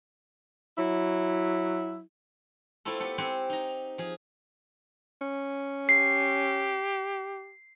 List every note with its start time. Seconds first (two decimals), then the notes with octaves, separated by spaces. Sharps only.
0.78 F#3 E4
2.85 A3 C4 E4 F4 A4
3.00 B3 E4 G4 A4
3.18 C4 G4 F#5 G#5 A#5
3.50 D#4 A#5
3.98 F3 G#4
5.21 C#4
5.89 G4 C7